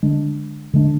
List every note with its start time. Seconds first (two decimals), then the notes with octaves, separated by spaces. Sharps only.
0.03 D3 G#3 D4
0.74 D3 G#3 D4